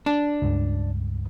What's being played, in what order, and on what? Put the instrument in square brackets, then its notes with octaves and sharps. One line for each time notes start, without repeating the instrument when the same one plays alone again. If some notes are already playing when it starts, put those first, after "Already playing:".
[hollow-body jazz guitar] D4
[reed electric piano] C#2 G2